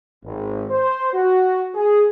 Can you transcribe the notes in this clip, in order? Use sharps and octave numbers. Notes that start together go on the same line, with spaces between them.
G#1
C5
F#4
G#4